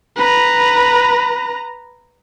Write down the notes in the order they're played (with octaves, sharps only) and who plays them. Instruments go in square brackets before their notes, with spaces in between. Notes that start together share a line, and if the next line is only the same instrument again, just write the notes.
[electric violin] B4 A#5